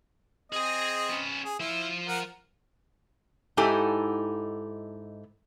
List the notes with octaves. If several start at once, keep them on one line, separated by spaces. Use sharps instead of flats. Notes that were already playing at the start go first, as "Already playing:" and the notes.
C4 G#4 D#5 G#5
B3 C#4
G#4
F3 E4 C6
A#4 F#5
G#2 D#4 E4 G4 A4 G#5